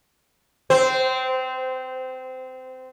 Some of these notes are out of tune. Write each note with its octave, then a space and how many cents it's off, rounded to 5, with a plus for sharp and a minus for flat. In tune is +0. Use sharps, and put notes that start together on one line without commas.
C4 -20 C5 -10